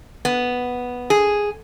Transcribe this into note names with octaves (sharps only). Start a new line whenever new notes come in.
B3
G#4